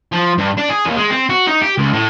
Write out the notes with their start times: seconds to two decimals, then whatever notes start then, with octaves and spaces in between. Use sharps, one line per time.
0.12 F3
0.38 G2
0.58 D4
0.70 G#4
0.86 D#2
0.97 G#3
1.10 C4
1.29 F#4
1.47 D#4
1.61 G4
1.78 C#2
1.93 A2